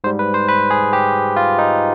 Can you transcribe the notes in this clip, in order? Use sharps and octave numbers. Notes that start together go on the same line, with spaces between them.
G#2 G3 C5
B4
C5
B4
G#4
G4
F4
D#4